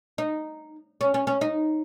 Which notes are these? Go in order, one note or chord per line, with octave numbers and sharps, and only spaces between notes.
D#4
C#4
C#4
C#4
D#4